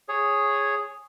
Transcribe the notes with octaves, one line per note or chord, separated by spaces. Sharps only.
G#4 C#5